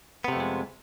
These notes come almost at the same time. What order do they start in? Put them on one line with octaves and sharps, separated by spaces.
B3 C3 A3 F2 G#3